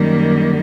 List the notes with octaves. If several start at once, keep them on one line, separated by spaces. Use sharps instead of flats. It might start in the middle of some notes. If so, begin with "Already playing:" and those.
Already playing: F#2 D#3 G3 A#3